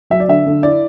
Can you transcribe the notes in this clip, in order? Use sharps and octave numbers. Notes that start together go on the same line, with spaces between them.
F#3 E5
D5
D3 E5
D3
E4 D5